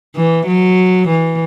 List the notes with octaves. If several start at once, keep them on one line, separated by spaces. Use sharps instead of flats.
E3
F#3
E3